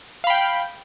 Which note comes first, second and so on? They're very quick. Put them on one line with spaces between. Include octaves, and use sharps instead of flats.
F5 B5 G5